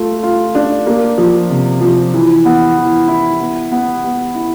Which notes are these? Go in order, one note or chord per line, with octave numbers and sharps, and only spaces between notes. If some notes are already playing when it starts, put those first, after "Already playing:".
Already playing: A3 F4
F4
D4
A#3
F3
C3
F3
E3
B3
E3
E4
B3
B3
B3
E4